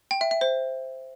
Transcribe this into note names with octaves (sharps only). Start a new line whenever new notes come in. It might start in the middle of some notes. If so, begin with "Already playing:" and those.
G5
E5
E5
C5